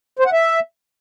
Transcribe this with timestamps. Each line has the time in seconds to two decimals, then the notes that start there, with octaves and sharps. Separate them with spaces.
0.19 C5
0.26 F#5
0.33 E5